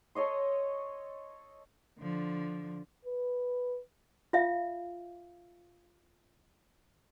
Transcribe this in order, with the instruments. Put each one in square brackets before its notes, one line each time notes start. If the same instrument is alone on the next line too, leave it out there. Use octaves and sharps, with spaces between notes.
[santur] A4 C#5 D#5 C6
[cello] D3 F3
[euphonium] B4
[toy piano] F4 E5 F5